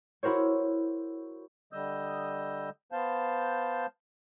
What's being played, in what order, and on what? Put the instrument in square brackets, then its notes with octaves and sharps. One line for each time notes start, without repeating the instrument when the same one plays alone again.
[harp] E4 F#4 A#4 C5 C#5
[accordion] D3 G3 D#5 D#6 E6 G6
B3 C5 F5 A5 G6